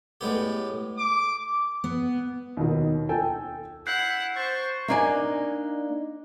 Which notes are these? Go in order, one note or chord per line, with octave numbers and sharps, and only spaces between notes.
A2 G#3 B3 G4
D6
B3
D#2 B2 D#3
A4 G5 G#5
E4 F#5 F#6 G6 C7
C5 C#6 A6
A#3 D4 D#4 D5 G#5